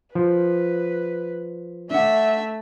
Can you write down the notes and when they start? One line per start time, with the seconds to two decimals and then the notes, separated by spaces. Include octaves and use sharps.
0.15 F3 B4
1.91 A3 D4 E5 F#5